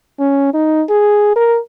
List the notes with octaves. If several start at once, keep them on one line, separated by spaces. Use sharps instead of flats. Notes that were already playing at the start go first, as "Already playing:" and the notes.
C#4
D#4
G#4
A#4